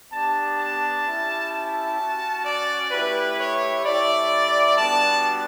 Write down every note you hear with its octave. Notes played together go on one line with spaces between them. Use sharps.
B3 D4 G4 A5
A5
C#4 E4 G4
A5
C#4 F#4
D5
A3 E4 G4 B4
C#5
A3 E4 G4 D5
G3 B3 D4 F#4 A5